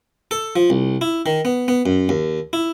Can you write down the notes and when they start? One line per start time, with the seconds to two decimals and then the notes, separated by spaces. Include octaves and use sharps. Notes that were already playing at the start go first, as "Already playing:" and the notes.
0.31 A4
0.56 F3
0.70 C2
1.01 E4
1.26 D#3
1.45 B3
1.68 B3
1.86 F#2
2.09 D#2
2.53 E4